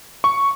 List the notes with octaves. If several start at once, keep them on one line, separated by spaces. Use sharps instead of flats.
C#6